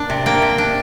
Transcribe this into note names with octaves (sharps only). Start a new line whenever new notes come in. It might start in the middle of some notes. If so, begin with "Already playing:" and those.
Already playing: A#3 D4
C3
A#3 G5
C3
D4